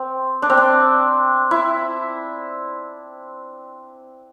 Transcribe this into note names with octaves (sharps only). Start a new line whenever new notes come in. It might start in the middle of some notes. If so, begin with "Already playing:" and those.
Already playing: C4
D4
C4
D4
E4